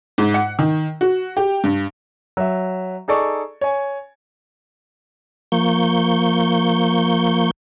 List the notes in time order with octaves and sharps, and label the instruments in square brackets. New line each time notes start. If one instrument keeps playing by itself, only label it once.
[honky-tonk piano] G#2
F#5
D#3
F#4
G4
G2
[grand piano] F#3 E5
D#4 G#4 A4 D5 C#6
C#5 G#5
[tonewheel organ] F3 A#3 C#6 G6